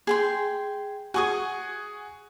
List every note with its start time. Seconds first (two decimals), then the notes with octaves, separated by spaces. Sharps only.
0.07 G#4 G5 C6
1.14 F#4 G#4 G#5 C#6 D#6